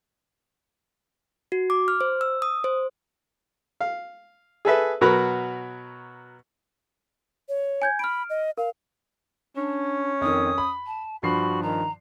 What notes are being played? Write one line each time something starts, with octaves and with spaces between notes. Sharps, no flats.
F#4
D6
F6
C5
E6
D#6
C5
F5
G#4 A4 B4 E5
B2 F#3 F#4 A#4 B4 B5
C#5
G#5 G6 G#6
B5 F6 D7
D#5
A#4 F5
C#4 D4
F2 D#3 D#6
B5
A5
G2 F3 F#4 B5 C7
D#3 A#5